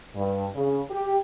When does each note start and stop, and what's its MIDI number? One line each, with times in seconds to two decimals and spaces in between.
0.15 0.46 43
0.55 0.81 49
0.90 1.16 67